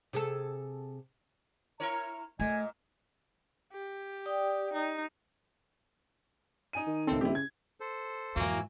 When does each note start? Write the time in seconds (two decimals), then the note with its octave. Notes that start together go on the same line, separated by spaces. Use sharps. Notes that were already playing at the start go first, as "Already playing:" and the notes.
0.13 C3 G#4 A4
1.80 E4 A#4 C#5 A#5
2.40 A#2 A3 D#5 G#5
3.72 G4
4.26 D5 G5 D#6
4.73 D#4
6.73 D#4 G#5 D#7
6.87 D#3
7.07 C#2 A2 C4 A4
7.21 D#1 E4 G4
7.35 C#3 G#6
7.80 A4 C5
8.36 F2 G#2 E3 F#3 A#3